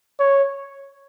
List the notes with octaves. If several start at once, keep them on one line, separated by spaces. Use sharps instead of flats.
C#5